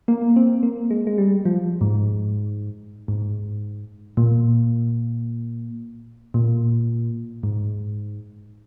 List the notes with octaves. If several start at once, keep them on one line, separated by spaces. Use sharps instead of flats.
A#3
C4
A#3
G#3
G#3
G3
F3
G#2
G#2
A#2
A#2
G#2